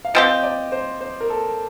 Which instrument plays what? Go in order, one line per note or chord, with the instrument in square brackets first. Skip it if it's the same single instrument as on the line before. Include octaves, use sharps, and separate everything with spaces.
[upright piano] F5
[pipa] F3 C4 G4 [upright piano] D#5
[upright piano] D5
C5
C5
A#4
A4